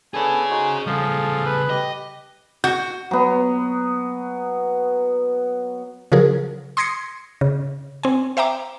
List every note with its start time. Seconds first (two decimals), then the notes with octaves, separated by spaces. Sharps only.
0.14 B3 D4 G#4 A4 C#5 G#5
0.50 D#4 F#4 C5
0.87 C#3 F3 G3 G#4 A4
1.46 B4
1.70 G4 D#5
2.64 F#4 G6
3.11 F#3 B3
6.12 C#3 F3 F#3 G#4 A#4
6.77 C6 D#6 G#6 A#6 C7 C#7
7.41 C#3
8.03 C4 G#5
8.37 C5 E5 G5 A#5 D6